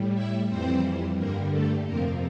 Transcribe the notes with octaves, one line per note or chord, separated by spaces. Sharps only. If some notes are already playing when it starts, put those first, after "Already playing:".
Already playing: A2 G3
E4 E5
F2 E3 G3 C4 C5
G2 D3 G3 A#3 A#4
A3 A4
F2 C3 F3 A#3 A#4